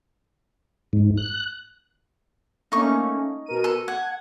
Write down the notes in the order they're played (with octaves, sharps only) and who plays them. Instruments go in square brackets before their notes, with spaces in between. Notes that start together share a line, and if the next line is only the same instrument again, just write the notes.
[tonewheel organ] G#2
F#6
[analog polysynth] A3 A#3 C#4 [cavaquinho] D#4 C#6
[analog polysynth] B2 A#4 D#7
[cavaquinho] A4
[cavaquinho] F#5 [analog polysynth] G#6